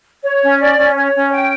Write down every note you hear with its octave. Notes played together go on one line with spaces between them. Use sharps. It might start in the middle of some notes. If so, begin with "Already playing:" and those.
C#5
C#4
D5
C#4
C#5
C#4
G5